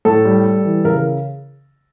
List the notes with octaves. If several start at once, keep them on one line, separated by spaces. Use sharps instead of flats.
A2 A4
G3
G3
E3
C#3 A#4